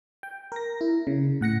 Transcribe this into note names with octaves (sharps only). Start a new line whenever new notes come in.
G5
A#4 A#6
E4
C#3
A2 F#5 A#6 C#7